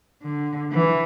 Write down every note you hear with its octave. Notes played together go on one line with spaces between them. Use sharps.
D3
E3